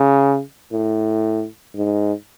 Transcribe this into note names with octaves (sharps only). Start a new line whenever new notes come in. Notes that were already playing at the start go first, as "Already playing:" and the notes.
Already playing: C#3
A2
G#2